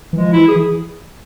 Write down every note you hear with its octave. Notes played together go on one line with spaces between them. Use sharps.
E3
F3 G#3
E3 E4
G#4